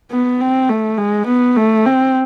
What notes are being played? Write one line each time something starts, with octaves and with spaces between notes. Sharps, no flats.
B3
C4
A3
G#3
B3
A3
C4